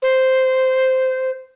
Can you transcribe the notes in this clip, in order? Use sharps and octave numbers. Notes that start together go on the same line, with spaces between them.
C5